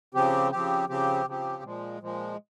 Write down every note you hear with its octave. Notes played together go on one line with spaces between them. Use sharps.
C#3 F3 C4 G4
C#3 F3 C4 G4
C#3 F3 C4 G4
C#3 F3 C4 G4
A#2 F3 G#3
A#2 F3 G#3